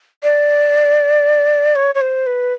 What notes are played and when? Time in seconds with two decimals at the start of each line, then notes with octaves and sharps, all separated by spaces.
0.23 D5
1.76 C#5
1.95 C#5
2.01 C5
2.27 B4